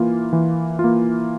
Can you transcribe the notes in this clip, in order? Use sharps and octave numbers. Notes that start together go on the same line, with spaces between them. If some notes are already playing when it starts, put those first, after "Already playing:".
Already playing: E3 A#3 F4
E3
F4
A#3